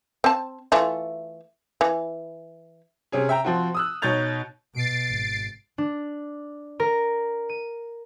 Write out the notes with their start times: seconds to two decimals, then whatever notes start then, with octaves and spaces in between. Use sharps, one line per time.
0.24 C4 A5
0.72 E3 A3 F4
1.81 E3
3.12 C3 C#4 G#4
3.29 E5 G5 A#5
3.45 F3 C4 F#4
3.74 D#6 E6 F#6
4.02 B2 D#4 C#5 G6 A6 F7
4.74 B2 A6 C7 D7
5.09 G#1
5.78 D4
6.80 A#4
7.49 D#7